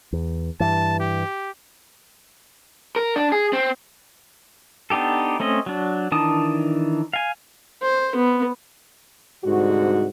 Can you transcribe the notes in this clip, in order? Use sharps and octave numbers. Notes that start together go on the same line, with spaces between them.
E2
G2 E3 A5
G4
A#4
D4
G#4
C4
B3 D4 D#4 G4 A4
A3 C4 C#4 D#5
F#3 D4
D#3 E3 D4 A5 D#6
F5 G#5
C5
B3
C2 G#2 D3 F#4